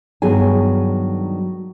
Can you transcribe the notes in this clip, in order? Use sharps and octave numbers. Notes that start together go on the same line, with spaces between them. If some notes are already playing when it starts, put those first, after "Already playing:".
G2 D#3 F#3 B3 G#4 G#5